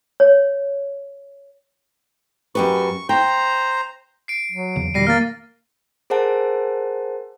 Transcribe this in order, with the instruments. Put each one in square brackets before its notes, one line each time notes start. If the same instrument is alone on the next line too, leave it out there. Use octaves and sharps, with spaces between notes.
[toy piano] C#5
[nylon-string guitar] F#2 G4 B4 [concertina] C#6
[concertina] C5 A#5 [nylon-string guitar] G5
[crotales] C7 D7
[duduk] F#3
[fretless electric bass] E2 C#3
[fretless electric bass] F2 B2 D#3 [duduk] G3 [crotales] A#6 C7 D#7
[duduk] A#3 [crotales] F6 A6
[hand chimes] G#4 A#4 C5 F#5 A5